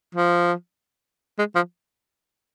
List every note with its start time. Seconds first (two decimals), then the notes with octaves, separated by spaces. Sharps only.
0.15 F3
1.38 G#3
1.55 F3